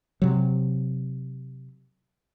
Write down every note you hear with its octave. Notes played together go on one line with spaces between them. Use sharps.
C3 F#3